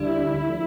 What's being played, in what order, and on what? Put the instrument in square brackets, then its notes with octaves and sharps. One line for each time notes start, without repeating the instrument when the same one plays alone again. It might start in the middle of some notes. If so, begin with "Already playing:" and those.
Already playing: [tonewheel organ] D2 D3 G3 D4 [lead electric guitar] E4
[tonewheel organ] F3 A3